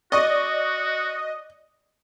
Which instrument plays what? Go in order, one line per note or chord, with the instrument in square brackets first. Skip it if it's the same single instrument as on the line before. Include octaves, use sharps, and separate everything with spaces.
[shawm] F#4 [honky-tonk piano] D5 C#6 [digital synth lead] D#5